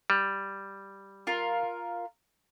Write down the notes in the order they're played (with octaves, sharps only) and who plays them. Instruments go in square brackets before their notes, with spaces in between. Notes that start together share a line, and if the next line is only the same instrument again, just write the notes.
[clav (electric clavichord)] G3
[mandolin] F4 A#4